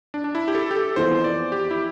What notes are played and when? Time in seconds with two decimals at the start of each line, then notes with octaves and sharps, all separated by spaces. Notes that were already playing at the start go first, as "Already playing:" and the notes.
0.14 D4
0.24 D4
0.35 E4
0.48 G4
0.55 A4
0.71 G4
0.76 A4
0.96 F2 E3 B3 C5
1.24 D5
1.52 G4
1.71 E4